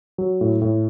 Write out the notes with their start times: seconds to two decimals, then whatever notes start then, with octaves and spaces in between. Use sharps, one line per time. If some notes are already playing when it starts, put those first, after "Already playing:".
0.18 F#3
0.41 A2
0.62 A2